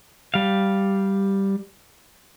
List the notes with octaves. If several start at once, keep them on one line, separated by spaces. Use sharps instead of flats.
G3 F5